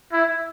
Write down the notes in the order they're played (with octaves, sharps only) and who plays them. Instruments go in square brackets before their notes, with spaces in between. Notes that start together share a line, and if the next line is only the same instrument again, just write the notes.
[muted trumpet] E4